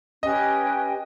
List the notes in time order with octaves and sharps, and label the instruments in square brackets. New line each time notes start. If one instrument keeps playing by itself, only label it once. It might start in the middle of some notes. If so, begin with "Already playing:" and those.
[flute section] C#4 G4 B4 G5 [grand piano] D#5